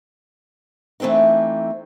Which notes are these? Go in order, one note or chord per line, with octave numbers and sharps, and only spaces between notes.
E3 A3 C4 D4 D#4